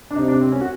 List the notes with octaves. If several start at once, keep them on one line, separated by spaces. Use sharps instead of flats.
D4
C3 D#4
D4
C4
C#4
F#4